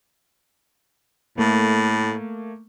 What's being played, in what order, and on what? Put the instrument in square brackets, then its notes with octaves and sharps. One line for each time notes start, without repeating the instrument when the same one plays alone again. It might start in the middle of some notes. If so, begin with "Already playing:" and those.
[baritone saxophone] A2 [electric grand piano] A3 A#3